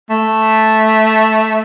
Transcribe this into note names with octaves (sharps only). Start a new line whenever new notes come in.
A3